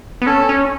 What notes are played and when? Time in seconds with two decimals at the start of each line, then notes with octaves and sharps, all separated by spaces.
0.22 B3
0.26 C#4 A4
0.49 C#4